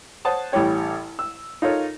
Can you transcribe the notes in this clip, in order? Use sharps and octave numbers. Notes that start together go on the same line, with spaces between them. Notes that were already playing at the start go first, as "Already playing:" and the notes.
C5 C#5 F#5 A5 D#6
A1 E3 G3 G4 C#5 G5
E6
D#4 F4 A4 A#4 C#5